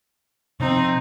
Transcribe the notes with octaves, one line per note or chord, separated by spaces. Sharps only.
C3 F3 C4 D#4